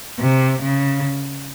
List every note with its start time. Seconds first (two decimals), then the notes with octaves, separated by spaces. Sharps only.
0.20 C3
0.62 C#3